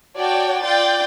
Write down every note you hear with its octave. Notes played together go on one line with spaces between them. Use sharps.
F#4 C#5 D5 G5 A5
F4 D5 G5 G6 A6